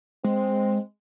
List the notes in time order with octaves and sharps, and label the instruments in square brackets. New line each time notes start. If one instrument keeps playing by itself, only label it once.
[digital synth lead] G#3 [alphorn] C4